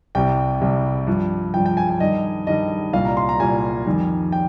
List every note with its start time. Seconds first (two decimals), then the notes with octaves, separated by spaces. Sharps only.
0.15 C2 C3 G3 G5
0.61 C2 C3 G3
1.07 G2 F3
1.54 G2 F3 G5
1.66 G5
1.77 G#5
1.89 G#5
2.00 G2 D#3 G3 D#5
2.47 G2 D#3 G3 D#5
2.93 C2 A#2 G3 F5
3.05 A#5
3.17 C6
3.29 A#5
3.40 C2 A#2 G3 G#5
3.86 F2 D#3 G3
4.32 G5